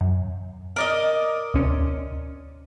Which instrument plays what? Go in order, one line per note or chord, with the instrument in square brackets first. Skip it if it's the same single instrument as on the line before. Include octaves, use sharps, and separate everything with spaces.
[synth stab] F#2
[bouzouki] A#4 D5 D#5
[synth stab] D2 C3 C#4